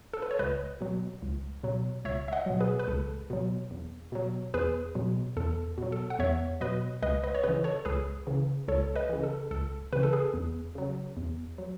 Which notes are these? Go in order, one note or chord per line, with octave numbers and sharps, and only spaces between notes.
A4
B4
C#5
C#2 B4 D#5
B2 F#3
C#2
B2 F#3
C#2 C#5 E5
E5
D#5 F#5
B2 F#3
G#4 B4
B4
C#2 A4
B2 F#3
E2
B2 F#3
E2 G#4 B4
B2 F#3
E2 A4
B2 F#3
A4
F#5
E2 C#5 E5
B2 F#3 B4 D#5
C#2 B4 D#5
B4 D#5
C#5
C#3 E3 B4 D#5
A4 C#5
C#2 G#4 B4
C#3 E3
C#2 A4 C#5
B4 D#5
C#3 E3
A4
C#2 A4
C#3 E3 B4
A4
G#4 B4
E2
C#3 F#3
E2
F#3